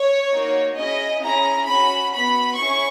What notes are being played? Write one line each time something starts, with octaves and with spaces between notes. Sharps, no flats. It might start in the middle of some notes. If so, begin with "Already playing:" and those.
Already playing: C#5
A#3 D#4 F#4
C#4 E4 G#4 D#5
C#4 E4 G#4 A#5
C#4 F#4 B5
B3 F#4 B5
C#4 E4 G#4 C#6